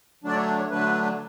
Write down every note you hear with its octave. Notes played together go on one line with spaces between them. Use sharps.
D3 F#3 A3 D4 D5
C#5
C#5
D3 F#3 A3 D4 B4